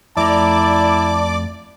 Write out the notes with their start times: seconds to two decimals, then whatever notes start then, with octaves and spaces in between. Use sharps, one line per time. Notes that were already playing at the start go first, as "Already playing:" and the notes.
0.17 F2 A3 E4 D5 A5 A#5 D6